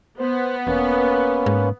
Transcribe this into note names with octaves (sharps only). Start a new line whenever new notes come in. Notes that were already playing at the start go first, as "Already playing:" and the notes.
B3 C5
E1 A#3 C#4 B4
G#2